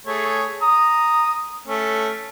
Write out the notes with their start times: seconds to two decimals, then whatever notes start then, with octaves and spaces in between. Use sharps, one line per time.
0.06 A3 G#4 C#5
0.62 A#5 D#6
1.67 A3 C#4